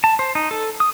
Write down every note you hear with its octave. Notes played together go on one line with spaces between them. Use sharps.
A5
C5
D#4
A4
D#6